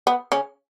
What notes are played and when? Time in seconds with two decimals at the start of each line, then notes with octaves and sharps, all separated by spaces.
0.07 B3
0.32 C#3 C#4